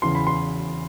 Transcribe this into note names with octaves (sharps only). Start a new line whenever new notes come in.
E2 C#3 E3 C6
B5
C6